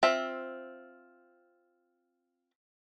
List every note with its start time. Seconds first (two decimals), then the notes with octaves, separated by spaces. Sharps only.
0.03 C4 F4 E5